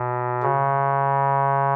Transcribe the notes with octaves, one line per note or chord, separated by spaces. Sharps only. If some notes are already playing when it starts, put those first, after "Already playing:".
Already playing: B2
C#3